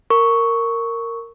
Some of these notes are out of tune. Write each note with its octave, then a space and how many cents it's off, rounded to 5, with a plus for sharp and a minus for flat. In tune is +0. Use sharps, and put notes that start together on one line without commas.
A#4 -15 C#6 +0